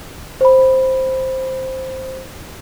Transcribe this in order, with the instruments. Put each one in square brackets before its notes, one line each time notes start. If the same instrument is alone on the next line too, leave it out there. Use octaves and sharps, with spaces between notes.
[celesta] C5 B5